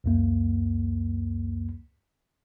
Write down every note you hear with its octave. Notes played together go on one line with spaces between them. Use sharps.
C#2 F#2 A#3